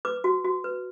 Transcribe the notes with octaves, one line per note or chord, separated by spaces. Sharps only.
B4 D6
F#4
F#4
B4